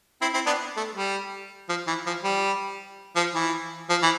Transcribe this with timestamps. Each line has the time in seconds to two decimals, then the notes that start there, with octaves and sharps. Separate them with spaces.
0.21 C4 E4
0.33 C4 E4
0.46 B3 D4
0.77 A3
0.95 G3
1.69 F3
1.87 E3
2.06 F3
2.24 G3
3.16 F3
3.35 E3
3.90 F3
4.03 E3